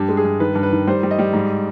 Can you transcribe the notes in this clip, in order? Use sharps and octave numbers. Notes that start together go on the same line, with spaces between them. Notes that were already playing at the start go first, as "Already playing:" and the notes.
Already playing: G2 G4
G#3
G#4
G2
D#3 B4
G2
B4
D#3
G3 C5
G3
D#5
G3
G#2